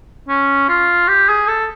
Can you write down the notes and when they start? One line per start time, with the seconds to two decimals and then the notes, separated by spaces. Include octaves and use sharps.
0.29 C#4
0.69 F4
1.08 G4
1.29 G#4
1.48 A4